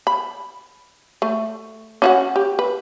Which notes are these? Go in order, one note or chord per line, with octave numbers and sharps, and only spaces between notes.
B5
A3
C#4 F#4 F#5
G4
B4